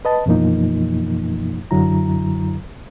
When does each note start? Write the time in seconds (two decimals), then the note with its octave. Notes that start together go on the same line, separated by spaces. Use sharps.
0.05 B4 D#5 A5
0.26 F#2 B2 E3 F3 A#3 D#4
1.71 F#2 D3 F#3 E4 A#5